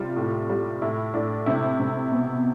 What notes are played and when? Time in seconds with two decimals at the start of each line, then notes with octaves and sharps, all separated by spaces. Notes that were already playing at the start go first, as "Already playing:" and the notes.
Already playing: C3 G3 F4
0.16 A2
0.49 G3
0.82 A2 E4
1.13 A2 D4
1.46 C3 E4
1.80 C3
2.11 B2